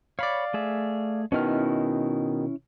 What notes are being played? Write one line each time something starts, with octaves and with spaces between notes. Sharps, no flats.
C#5 D5 F5 B5
A3 G#4 E5
B2 D#3 C#4 E4 F6